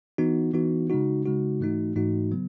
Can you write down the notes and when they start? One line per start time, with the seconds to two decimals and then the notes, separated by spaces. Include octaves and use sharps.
0.18 E3 B3 D#4 F#4
0.54 E3 B3 D#4 F#4
0.90 C#3 G#3 D#4 F#4
1.25 C#3 G#3 D#4 F#4
1.60 G#2 E3 A3 D#4 F#4
1.96 G#2 E3 A3 D#4 F#4
2.32 C#3 F#3 B3